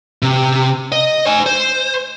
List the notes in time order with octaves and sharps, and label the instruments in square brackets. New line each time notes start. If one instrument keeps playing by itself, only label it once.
[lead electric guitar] C3
D#5
C5 G#5
C5